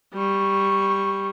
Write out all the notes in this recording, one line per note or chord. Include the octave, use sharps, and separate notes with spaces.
G3 C#6